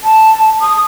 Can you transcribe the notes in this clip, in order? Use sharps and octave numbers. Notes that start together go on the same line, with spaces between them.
A5
D#6